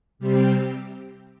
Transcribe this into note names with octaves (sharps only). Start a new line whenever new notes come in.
C3 G3 C4 G4